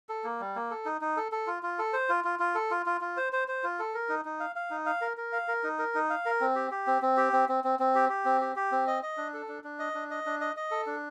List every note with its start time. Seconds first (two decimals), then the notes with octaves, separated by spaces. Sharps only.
0.09 A4
0.24 A#3
0.40 G3
0.56 A#3
0.71 A4
0.85 D#4
1.01 D#4
1.17 A4
1.32 A4
1.47 F4
1.63 F4
1.79 A4
1.93 C5
2.09 F4
2.24 F4
2.39 F4
2.55 A4
2.71 F4
2.86 F4
3.01 F4
3.17 C5
3.33 C5
3.48 C5
3.64 F4
3.79 A4
3.94 A#4
4.09 D#4
4.25 D#4
4.40 F5
4.56 F5
4.71 D#4
4.86 F5
5.01 A#4
5.17 A#4
5.32 F5
5.48 A#4
5.64 D#4
5.79 A#4
5.95 D#4
6.10 F5
6.26 A#4
6.41 C4
6.55 G4
6.71 G4
6.87 C4
7.02 C4
7.17 G4
7.33 C4
7.49 C4
7.64 C4
7.79 C4
7.95 G4
8.09 G4
8.25 C4
8.41 G4
8.56 G4
8.72 C4
8.87 D#5
9.03 D#5
9.17 D4
9.34 A4
9.48 D4
9.64 D4
9.79 D#5
9.95 D4
10.11 D#5
10.26 D4
10.41 D#5
10.57 D#5
10.71 A4
10.86 D4